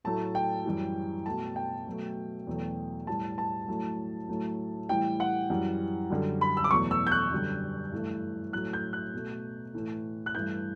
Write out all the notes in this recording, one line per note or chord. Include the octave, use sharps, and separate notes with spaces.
A2 F#3 A3 A5
G5
F#2 E3 G3
B2 A3 A5
G5
B2 F#3 A3
E2 B2 F#3 A3
A2 G3 A5
A5
A2 F#3 A3
A2 F#3 A3
A2 E3 G3 G5
F#5
F#2 E3 G3
F#2 D3 G3
B5
E6
D6
E2 B2 F#3 A3 C#6
E6
G6
F#6
F#2 D3 G3
G2 E3 A3
A2 F#3 A3 F#6
G6
F#6
B2 A3
A2 E3 A3
F#6
G2 E3 A3 G6